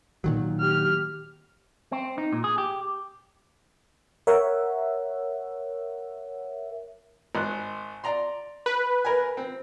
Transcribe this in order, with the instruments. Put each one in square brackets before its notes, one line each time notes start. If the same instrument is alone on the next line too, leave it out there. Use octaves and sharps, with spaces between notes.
[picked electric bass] A#2 D#3 F#3
[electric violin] G4 F6
[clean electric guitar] C4
D#4
A#2
G#4
G4
[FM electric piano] A#4 C#5 E5 F#5
[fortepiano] G#1 F#6
D5 A#5 C6
[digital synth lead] B4
[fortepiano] A#4 G#5
C4